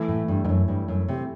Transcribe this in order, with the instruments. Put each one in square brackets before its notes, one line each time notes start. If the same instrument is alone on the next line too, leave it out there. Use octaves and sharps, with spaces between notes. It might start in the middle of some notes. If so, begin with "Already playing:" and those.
Already playing: [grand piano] E3 A3 E4
[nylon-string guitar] A2
G2
G2
F#2
G2
F#2
C3